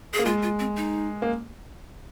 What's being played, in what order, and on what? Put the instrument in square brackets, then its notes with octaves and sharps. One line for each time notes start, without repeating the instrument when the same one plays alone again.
[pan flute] G#4
[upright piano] A#3
[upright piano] G#3 [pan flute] F4
[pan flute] F4
C4
D#4
[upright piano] A#3